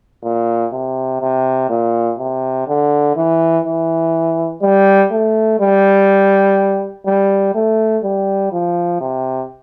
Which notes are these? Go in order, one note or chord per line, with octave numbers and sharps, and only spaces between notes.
A#2
C3
C3
A#2
C3
D3
E3
E3
G3
A3
G3
G3
A3
G3
F3
C3